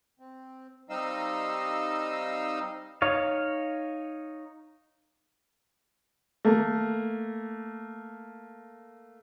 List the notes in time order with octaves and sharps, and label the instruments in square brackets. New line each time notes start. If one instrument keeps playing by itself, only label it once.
[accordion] C4
G3 C4 D#4 D#5 F5 E6
[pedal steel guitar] D#4 C#5 F5
[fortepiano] A3 A#3